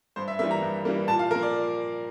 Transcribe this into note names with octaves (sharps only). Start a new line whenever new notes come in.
G2 C5
E5
E3 G3 A#3 E5
A#5
G2
E3 G3 A#3
A#2 A5
F5
F3 A#3 A#4
D5